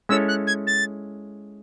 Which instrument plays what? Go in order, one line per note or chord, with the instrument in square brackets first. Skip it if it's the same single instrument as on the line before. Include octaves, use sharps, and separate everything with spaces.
[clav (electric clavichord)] G#3 C#4 E4 A4 C#5 [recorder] E6
[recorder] F#6
G#6
A6